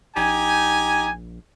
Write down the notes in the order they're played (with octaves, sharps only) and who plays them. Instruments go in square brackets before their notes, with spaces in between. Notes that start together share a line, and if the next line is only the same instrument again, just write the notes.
[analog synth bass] A#1 [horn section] D#4 G4 G#5